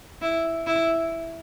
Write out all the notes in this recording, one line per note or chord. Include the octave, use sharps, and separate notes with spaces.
E4
E4